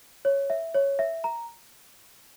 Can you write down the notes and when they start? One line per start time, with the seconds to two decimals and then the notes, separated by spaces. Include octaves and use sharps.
0.25 C#5
0.50 E5
0.75 C#5
0.99 E5
1.24 A#5